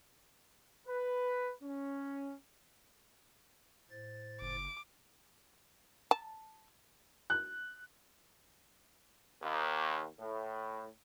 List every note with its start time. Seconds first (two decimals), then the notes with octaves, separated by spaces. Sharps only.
0.87 B4
1.62 C#4
3.90 A2 C5 A6
4.41 F#1 D6
6.11 A5
7.30 F#6
9.42 D#2
10.20 A2